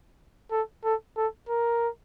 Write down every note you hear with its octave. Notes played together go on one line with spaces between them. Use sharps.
A4
A4
A4
A#4